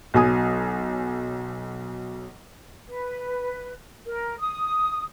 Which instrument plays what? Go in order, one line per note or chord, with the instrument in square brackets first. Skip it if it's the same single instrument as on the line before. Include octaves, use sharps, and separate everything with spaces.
[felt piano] B1 F#3 G#5 D#6
[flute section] B4
A#4
D#6